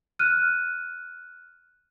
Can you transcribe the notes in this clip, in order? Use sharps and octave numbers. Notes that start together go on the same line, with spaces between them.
F6 F#6 D#7